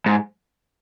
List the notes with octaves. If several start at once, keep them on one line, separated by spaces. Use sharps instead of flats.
G#2